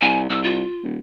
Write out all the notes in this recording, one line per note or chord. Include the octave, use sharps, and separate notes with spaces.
C2 G#5
C2 E6
F4
D#1